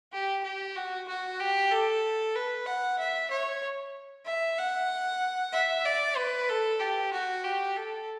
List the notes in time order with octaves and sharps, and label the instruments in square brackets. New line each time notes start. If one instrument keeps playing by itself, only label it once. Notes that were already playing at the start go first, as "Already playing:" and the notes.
[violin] G4
G4
F#4
F#4
G4
A4
B4
F#5
E5
C#5
E5
F#5
E5
D5
B4
A4
G4
F#4
G4
A4